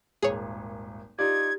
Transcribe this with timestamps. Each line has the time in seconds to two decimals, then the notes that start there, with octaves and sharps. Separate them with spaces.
0.22 D#1 G#1 G#4 C#5
1.19 D#4 F4 G4 D5 G#6